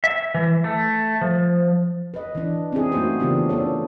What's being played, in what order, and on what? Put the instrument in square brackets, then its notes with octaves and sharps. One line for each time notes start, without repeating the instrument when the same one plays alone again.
[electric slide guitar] E5
E3
A3
F3
[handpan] B4 D#5
E3 D4
C4 C#4 E4 G#4
A3 A#3 D#4 F#4 C5
C#3 E3 B3 D4 F4 G4
A#3 D4 A4 C#5